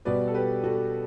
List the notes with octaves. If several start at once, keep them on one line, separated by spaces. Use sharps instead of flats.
B2 G3 B3 B4 D5
A4
G4 B4
F#4 A4